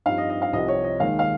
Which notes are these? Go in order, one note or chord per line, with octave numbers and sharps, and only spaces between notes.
G2 F3 C4 D#4 F5
D#5
D#5
F5
C2 C3 F3 D#5
C#5
D#5
D#2 D#3 G#3 F5
F5